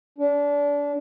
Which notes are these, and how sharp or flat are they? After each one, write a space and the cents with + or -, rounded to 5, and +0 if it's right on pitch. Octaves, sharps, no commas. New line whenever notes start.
D4 -25